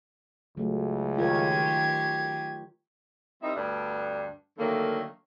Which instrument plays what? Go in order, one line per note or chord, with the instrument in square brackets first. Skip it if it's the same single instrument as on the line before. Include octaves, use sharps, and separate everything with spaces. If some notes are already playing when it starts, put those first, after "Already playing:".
[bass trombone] C#2 [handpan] F#3 A3
[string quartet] D#3 G4 G#6 [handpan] F4 A#4 C#5
[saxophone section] G3 C4 D#4 E4 A#4 E5
D2 G2 B3 D4
D3 D#3 F#3 A3 A#3